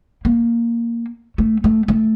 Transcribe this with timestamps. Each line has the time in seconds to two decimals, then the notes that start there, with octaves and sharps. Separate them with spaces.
0.25 A#3
1.38 A3
1.64 A3
1.88 A3